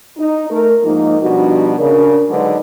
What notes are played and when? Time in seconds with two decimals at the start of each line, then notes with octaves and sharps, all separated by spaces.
0.17 D#4
0.49 A3 A#4
0.84 G#2 F3 A#3 D#4
1.21 B2 F3 G3 D4 D#4 F#4
1.78 C#3 D4 A#4
2.29 D3 F#3 G#3 D#4 F#4 B4